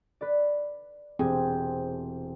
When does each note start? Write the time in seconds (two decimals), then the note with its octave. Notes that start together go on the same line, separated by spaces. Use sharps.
0.21 B4 D5
1.19 E1 C4 G4 G#4